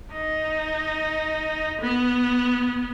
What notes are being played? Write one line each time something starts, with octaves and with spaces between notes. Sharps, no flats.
D#4
B3